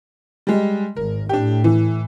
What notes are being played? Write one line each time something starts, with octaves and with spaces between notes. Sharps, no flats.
G3 G#3
G#1 A#4
A2 D4 G4
E3